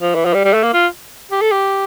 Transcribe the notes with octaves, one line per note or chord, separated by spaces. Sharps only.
F3
E3
F3
G3
G3
A3
A#3
F4
G4
A4
G4